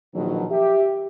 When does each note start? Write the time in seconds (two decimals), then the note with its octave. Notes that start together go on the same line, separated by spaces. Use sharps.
0.14 A#1 B2 D#3 F#3
0.51 G4 E5